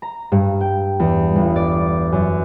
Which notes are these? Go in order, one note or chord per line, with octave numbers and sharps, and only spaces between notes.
A#5
G2
G5
E2
G1
D5
F#2